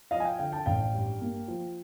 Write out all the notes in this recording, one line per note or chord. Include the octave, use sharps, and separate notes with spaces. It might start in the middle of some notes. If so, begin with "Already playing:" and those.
F3 D#5 F5
G#5
F5 G5
D3 F5 G5
G5 A5
A1 F5 G5
G2
A#3
F3